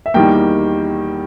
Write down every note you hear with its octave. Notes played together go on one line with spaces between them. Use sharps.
E5
E2 D#3 G3 A#3 G5